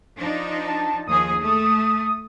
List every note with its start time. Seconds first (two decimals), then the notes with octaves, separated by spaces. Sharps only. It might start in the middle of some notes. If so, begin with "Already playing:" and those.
0.16 F3 D4 D#4
0.67 A5
1.08 D#2 F3 G#4 D#6
1.41 A3